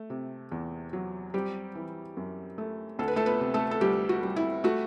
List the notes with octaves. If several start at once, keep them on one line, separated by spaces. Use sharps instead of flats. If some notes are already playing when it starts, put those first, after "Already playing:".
Already playing: A3
C3
E2
F#3
G3 C4 G4
E3
F#2
A3
D2 A4
B4
A3 A4
B3 B4
C3
A3 A4
A4
D2 G3 G4
F#4
G3
E4
A3 F#4